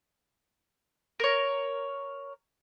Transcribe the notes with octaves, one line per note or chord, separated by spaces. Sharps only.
A#4 C#5